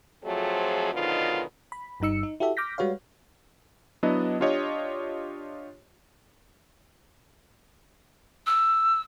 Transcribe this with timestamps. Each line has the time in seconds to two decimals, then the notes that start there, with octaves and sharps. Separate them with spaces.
0.24 F2 F3 F#3 A3 C4 G#4
0.94 G#2 B2 D3 D#3 F#3 F4
1.72 B5
2.00 G1 G2 G3 D#4 E6 C#7
2.23 D#4
2.40 E4 F#4 G4 A4 E5
2.57 D6 F6 G6 A#6 B6
2.78 G3 G#3 F#4 B4 C#5 F5
4.03 F#3 B3 D4 E4 D#5
4.40 D4 F4 G4 C#5 D#5
8.47 E6